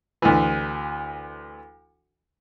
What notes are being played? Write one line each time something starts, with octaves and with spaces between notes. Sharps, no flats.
D2 E3